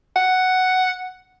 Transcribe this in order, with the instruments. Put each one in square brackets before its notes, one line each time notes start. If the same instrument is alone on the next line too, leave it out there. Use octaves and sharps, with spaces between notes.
[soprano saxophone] F#5